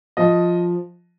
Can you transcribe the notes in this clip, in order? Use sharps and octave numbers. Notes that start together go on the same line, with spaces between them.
F3 D#5